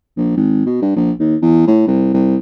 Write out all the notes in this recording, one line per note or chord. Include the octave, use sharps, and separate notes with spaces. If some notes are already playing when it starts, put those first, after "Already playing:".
A#1
G#1
B2
G2
A#1
D#2
E2
A2
C2
C2